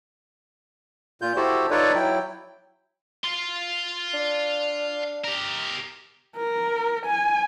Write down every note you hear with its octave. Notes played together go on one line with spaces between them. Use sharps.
A#2 F4 G6
E4 F#4 G4 A4 C5
D#4 F4 A4 B4 C#5 D5
F#3 E4 G5
F5 C6
D4
G4 A#4
A#4
G#5